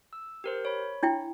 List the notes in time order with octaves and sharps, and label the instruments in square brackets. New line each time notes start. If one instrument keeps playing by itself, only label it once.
[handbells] E6
G4 A#4 C5
C#5 B5
[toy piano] D4 E4 G5